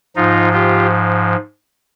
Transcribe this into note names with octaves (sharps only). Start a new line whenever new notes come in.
G#2 F3 D#4 F4
F4 G4